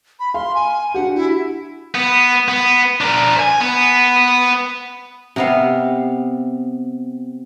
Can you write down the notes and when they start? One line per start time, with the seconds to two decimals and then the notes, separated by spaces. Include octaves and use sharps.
0.20 B5
0.34 F5 C6
0.55 G#5
0.94 D4 F#4 G4 F#5
1.15 E4
1.95 B3
2.49 B3
3.01 D4 A#4
3.36 C5 G#5
3.60 B3
5.36 C3 B3 F5